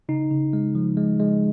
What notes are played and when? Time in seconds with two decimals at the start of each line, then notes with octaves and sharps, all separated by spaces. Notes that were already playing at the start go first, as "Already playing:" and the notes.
0.09 C#3 D#4
0.31 C#3
0.53 G#3
0.75 F3
0.97 G#3
1.20 G#3